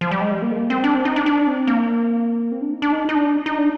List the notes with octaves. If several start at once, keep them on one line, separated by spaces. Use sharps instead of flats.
F3
G3
G#3
G3
A#3
G#3
A#3
C4
D4
C4
D#4
D4
D4
C4
A#3
C4
D4
D#4
D4
D#4
D#4
D4
D#4
D4